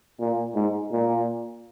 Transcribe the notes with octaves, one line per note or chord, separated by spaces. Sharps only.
A#2
G#2
A#2